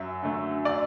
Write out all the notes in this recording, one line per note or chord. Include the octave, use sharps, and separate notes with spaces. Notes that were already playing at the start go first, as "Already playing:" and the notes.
Already playing: F#2 E5
D3 A3
D5